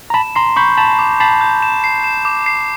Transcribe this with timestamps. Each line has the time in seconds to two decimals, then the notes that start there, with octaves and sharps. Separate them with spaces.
0.10 A#5
0.14 A5 B5 E7
0.35 A#5 C6 C7
0.56 B5 C#6 G6
0.77 A5 B5 E7
0.99 D6
1.20 A5 B5 C7
1.41 G6
1.62 E7
1.84 C7
2.04 E7
2.25 D6
2.46 C7